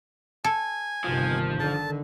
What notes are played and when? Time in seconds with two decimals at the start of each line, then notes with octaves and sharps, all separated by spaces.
0.44 A4 G#5
1.04 G1 C3 D#3 F3
1.60 D3 D#3 A5